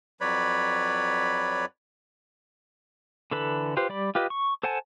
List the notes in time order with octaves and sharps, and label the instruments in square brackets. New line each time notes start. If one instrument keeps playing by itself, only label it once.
[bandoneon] F2 F#3 B4 C#5 D5 B5
[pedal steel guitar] D3 E3 A4 B4 B5
F4 G4 B4 C5
G3 D5 B5
F4 G4 B4 D#5
C#6
A4 C5 F#5 G#5 A5